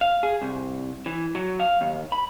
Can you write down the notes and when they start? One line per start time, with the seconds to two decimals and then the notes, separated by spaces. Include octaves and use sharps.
0.01 F5
0.23 G#4
0.42 C2
1.06 E3
1.35 F#3
1.60 F5
1.81 D#2
2.12 B5